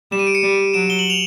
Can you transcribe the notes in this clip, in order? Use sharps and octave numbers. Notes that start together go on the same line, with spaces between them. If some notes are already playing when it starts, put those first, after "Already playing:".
G3 E7
D#7
D7
C#7 D#7
G3
F#3 D7 E7
G7
F#7
F7